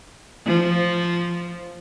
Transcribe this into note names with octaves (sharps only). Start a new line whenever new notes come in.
F3